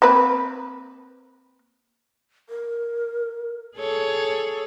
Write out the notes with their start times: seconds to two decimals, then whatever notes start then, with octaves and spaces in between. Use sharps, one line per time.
0.02 A#3 C4 B4
2.49 A#4
3.78 G#4 A4 C#5